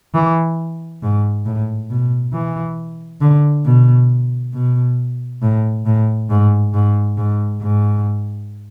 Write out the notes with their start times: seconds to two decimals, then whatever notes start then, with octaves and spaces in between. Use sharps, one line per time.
0.14 E3
1.03 G#2
1.46 A2
1.90 B2
2.33 E3
3.21 D3
3.65 B2
4.54 B2
5.42 A2
5.86 A2
6.30 G#2
6.74 G#2
7.18 G#2
7.61 G#2